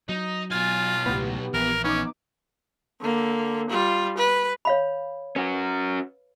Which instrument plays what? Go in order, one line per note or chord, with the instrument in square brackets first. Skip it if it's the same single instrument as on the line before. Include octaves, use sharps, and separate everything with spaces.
[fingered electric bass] F#3 [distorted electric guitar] D#4
[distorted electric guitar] B1 G#5 [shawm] F4 [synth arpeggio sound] A6
[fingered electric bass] C#2 A2 [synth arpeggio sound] B3 G4
[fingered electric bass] A#1 [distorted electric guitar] E3 [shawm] A#4
[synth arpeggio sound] B3 D#4 D6 [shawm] C#4
[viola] D3 A#3
G3 F4
B4
[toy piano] C#5 F5 B5
[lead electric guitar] C#4 F#4 [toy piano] B4